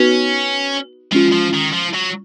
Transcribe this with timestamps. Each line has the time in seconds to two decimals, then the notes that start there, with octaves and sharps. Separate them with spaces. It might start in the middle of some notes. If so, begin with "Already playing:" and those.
Already playing: B3 C#4 D#4 F#4 B4
1.12 F3 G#3 C#4 F4
1.32 F3
1.53 D#3
1.72 F3
1.94 F#3